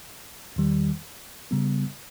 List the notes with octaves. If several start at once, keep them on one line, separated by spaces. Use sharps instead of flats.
E2 D#3 G3
C#3 G3 B3